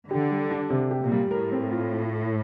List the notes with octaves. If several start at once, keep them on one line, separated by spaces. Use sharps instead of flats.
D3 G4
G3
D4
C3
G4
A#2
G3
A2 A#4
C4
F4